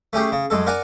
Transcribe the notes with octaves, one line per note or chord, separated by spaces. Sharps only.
A3 C#4 G4 G#4
C#3
F#2 G#3 A4
A#4 D5 F#5 G#5 A#5